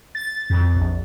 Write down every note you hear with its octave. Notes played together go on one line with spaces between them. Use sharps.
A6
F2
A#1